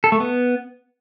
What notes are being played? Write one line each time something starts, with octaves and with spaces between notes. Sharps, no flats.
A4
A3
B3